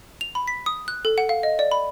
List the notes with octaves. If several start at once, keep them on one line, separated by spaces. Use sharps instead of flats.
F7
B5
B6
D#6
F#6
A4
F#5
F5
D#5
D5
B5